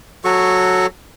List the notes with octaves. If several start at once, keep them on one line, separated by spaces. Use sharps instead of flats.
F#3 F#4 A4 C#6